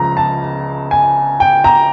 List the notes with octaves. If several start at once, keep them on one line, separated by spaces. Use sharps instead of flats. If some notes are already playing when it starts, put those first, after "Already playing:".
Already playing: C#2 C#3 F3 A#5
A5
G#5
G5
A#5